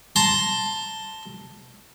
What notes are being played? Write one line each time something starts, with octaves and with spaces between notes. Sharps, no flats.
A5 A#5 C6